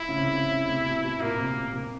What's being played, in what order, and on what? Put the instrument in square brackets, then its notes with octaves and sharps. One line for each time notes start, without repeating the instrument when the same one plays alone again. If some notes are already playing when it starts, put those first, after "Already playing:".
Already playing: [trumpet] E4
[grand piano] C#3
C3
C#3
C#3
C3
B2
B2
[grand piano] A#2 [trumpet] A#3
[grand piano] C3
C3
C3